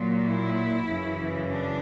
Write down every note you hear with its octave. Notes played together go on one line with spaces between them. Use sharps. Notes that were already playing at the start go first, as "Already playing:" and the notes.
Already playing: A#2 F#3
E4
F#2 C#3 E3
D4